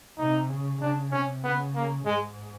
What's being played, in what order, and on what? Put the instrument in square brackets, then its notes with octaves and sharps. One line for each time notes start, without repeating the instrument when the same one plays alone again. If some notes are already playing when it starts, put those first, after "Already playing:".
[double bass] C3 [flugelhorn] D#4
[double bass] C#3
[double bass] C#3 [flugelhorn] D4
[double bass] C3 [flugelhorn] C#4
[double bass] C#3 [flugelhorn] B3
[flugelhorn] A#3
[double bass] G#2 [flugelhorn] G#3